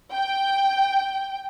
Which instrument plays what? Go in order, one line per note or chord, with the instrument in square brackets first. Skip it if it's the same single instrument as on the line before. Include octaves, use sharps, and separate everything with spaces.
[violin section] G5